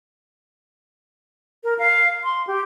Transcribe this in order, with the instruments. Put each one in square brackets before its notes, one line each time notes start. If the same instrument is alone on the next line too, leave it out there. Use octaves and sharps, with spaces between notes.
[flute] A#4
F5
C6
G4